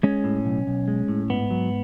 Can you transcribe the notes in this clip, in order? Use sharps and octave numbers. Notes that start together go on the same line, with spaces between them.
G#3 C#4
A2
B1
B1
G#3
A2
G#2 B3
F#3